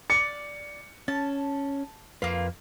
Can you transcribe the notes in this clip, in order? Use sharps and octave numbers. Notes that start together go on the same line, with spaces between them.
D5 C#7
C#4 A5
F2 A#3 F4 B4